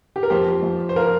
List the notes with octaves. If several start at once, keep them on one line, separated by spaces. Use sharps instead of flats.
G4
A#4
F2 F3 G4 C5
F2 F3
C5
F3 F4 A#4